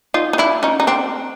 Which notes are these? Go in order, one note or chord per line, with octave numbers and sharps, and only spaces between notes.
D#4 F4
D#4
D4 E4
C#4 D#4
D#4
C4 D4